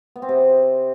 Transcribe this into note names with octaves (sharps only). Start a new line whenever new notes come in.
B3
C4
C3